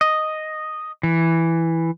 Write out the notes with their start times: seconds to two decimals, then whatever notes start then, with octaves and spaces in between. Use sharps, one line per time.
0.01 D#5
1.03 E3